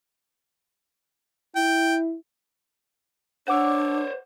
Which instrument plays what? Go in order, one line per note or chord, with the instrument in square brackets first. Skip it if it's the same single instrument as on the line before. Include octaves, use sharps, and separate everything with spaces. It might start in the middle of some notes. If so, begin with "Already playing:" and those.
[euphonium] E4 [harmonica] G5
[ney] D4 [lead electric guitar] C5 C#5 [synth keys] F#5 D6 E6